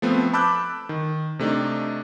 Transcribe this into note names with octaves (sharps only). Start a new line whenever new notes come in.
F3 A3 B3 C4
A5 B5 D6 E6 F#6 G6
D#3
C3 A3 D4 D#4